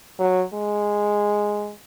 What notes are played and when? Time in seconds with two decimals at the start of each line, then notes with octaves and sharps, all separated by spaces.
0.19 F#3
0.54 G#3